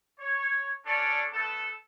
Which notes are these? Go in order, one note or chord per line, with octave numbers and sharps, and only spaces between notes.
C#5
C#4 D4 A4 C#5 D5
A3 B3 A4